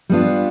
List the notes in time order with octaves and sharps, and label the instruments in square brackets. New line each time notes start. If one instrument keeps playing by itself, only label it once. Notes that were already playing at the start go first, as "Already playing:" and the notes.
[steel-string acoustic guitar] G3 B3 D4 F4